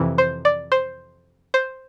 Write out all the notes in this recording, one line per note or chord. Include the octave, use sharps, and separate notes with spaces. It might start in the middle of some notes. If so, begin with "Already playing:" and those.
Already playing: F2 C3 E3
C5
D5
C5
C5